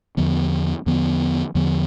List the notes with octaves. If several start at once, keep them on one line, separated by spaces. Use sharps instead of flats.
E2 D3 F3 B3
E2 D3 F3 B3
E2 D3 F3 B3